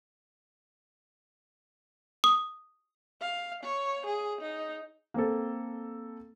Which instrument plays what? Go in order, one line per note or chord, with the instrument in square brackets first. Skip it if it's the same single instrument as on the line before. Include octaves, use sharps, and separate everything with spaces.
[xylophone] D#6
[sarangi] F5
C#5
G#4
D#4
[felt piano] A#3 C4 A4